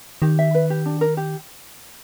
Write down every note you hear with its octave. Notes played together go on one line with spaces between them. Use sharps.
D#3 G4
E5
B4
G4
D4
A#4
G4